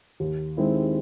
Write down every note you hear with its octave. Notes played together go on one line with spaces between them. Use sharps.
D#2
D#3 G#3 C4 E4